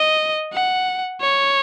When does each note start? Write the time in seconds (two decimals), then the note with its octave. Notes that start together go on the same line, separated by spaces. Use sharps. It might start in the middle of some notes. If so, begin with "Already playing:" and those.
Already playing: D#5
0.53 F#5
1.21 C#5